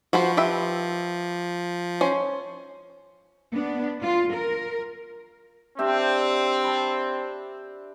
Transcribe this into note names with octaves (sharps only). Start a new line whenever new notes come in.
F3 F#4 B4 C5
G4 B4 E5
C#4 C5
B3 D4
F4
A#4
C4 D4 G4 E5
A5 B5